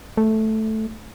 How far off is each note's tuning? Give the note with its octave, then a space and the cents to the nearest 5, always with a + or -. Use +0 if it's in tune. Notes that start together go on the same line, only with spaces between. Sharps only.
A3 -5